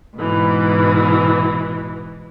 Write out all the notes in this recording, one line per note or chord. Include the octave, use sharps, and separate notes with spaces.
G#2 B2 E3